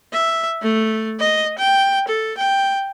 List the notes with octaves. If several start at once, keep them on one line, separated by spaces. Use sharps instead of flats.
E5
A3
D#5
G5
A4
G5